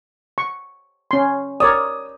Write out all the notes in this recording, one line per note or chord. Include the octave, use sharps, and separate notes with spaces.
C#6
C#4 C6
A#4 C#5 D5 D#6